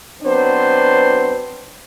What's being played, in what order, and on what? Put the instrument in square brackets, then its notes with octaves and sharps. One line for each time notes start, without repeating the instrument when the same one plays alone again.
[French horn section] F#3 B3 C4 D4 C5